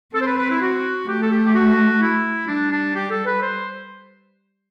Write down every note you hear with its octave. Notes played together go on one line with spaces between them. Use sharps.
C4 A4
C5
B4
B4
E4
F#4
A3 G4
A4
G4
G4
F#4
E4
G3 D4
D4
G4
A4
B4
C5